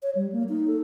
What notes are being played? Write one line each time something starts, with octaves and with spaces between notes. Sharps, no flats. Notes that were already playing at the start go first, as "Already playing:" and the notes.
C#5
G3
A#3
D#4
A4